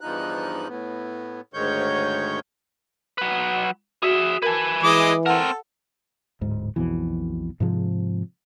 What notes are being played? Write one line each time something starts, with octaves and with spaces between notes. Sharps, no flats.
E2 G2 F3 D#4 F#6
A2 B3
D2 G#2 D#3 C#5 G6
F#3 B4
F#4 G#4 E5
A#4 B4 G#5 A5
E3 G#3 D#5 D6
C4 A4 A#4 F#5
D1 G#2
B1 F2 B2 E3
G#2 C3 F3 G#3